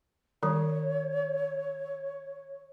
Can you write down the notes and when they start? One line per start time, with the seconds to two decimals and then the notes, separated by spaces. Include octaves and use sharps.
0.43 D#3 G3 C#5